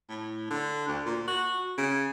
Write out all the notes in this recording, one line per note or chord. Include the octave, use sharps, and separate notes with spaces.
A2
D3
D2
A#2
F#4
C#3